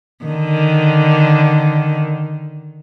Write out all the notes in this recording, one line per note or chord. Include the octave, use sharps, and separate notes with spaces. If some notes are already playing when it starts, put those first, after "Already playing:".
D3 D#3